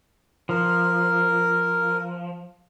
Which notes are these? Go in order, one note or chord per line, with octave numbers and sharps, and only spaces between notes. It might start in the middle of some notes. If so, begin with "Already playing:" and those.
F3 A#4